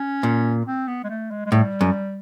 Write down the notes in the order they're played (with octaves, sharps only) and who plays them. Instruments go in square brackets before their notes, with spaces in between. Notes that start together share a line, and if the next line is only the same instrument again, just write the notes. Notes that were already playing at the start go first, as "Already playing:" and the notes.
Already playing: [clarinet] C#4
[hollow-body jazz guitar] A#2
[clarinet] C4
B3
G#3
A3
G#3
G#3
[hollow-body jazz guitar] A2 [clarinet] G3
[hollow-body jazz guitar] F#2